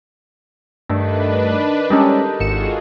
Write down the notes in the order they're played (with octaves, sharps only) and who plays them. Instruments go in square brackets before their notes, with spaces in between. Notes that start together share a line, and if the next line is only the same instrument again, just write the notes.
[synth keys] G2 A3 [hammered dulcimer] D#3 [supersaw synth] D4 B4
[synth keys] G3 G#3 C#4 [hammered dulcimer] D#4 G4 A4
[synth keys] G#1 C#7 E7 [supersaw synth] F4 F#4 G#4